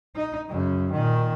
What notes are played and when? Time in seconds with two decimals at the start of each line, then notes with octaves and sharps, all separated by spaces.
0.15 D#4
0.48 F#2 C#3
0.92 A#2 D#3